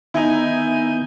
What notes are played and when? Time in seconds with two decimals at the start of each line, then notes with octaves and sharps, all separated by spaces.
0.14 D#3 B3 D#4 E4 G#5 G6